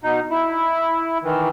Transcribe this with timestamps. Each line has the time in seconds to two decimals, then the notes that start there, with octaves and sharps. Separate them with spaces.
0.03 B2 D#4
0.30 E4
1.24 D#3 E3